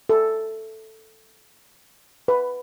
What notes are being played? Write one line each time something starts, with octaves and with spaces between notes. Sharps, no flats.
A4
B4